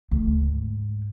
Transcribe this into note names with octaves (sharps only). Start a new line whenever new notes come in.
D2
G#2